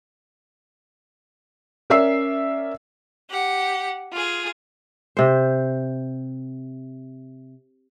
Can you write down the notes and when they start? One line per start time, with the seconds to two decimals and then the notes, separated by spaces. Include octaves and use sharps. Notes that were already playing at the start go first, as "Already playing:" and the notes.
1.90 C#4 A#4 D5 E5 E6 C7
3.30 G4 F#5
4.13 F4 G#4
5.17 C3 C5